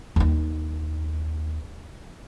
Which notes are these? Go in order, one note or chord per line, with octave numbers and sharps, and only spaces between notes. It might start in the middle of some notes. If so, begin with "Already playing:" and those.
D#2 D#4